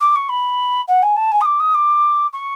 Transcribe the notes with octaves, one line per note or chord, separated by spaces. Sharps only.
D6
C#6
B5
F#5
G#5
A5
G#5
D#6
D6
D#6
D6
C#6